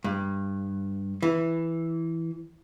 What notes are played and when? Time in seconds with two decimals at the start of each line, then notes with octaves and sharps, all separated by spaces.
0.04 G2
1.22 E3